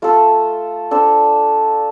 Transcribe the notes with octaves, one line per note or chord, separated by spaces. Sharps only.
A3 F4 A4
D4 A4 C5